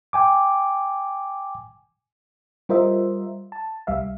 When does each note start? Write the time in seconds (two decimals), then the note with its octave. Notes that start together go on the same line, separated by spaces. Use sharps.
0.13 G5 G#5 D6
2.69 G3 F4 A#4 C5 D#5 E5
3.52 A5
3.87 C2 G3 E5 F5